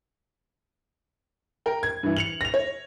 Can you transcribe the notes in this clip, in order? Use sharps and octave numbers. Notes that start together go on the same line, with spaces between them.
A#4 G5
G#6
G2 E3
C#7 F7 F#7
A#6 F7
C#5